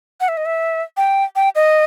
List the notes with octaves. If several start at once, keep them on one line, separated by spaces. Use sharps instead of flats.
F#5
E5
D#5
E5
G5
G5
D#5